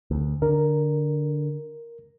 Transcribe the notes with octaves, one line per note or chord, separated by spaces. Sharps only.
D2
D3 A#4